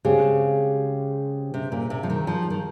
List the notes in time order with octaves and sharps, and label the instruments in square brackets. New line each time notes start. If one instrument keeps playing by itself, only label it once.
[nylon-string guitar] C#3 [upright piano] G#3 C4 G4
[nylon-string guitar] C3
A#2
C3
F3
D#3
F3
D#3